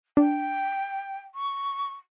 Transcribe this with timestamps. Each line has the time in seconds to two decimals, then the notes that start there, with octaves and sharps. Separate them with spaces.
0.17 D4 G5
1.34 C#6